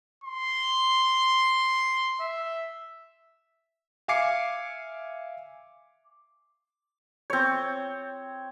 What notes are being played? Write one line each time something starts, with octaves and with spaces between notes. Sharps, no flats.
C6
E5
E5 F5 G#5 D6 C7 C#7
C4 C#5